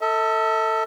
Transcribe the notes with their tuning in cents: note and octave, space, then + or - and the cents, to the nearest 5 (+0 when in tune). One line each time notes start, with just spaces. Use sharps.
A4 +20 E5 -45